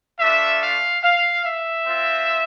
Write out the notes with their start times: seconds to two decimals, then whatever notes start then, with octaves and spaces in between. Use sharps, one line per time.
0.20 A3 D4 F4 E5
0.62 F5
1.04 F5
1.45 E5
1.87 C4 F4